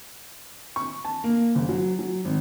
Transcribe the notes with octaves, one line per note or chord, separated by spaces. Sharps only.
C#6
A5
A#3
F#1
F#3
F#3
G#1